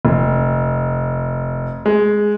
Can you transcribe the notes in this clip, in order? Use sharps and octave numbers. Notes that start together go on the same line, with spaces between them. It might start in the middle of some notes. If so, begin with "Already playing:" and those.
F1
G#3